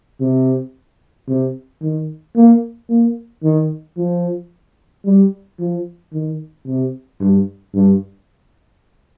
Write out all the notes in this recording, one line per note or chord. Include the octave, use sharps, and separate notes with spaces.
C3
C3
D#3
A#3
A#3
D#3
F3
G3
F3
D#3
C3
G2
G2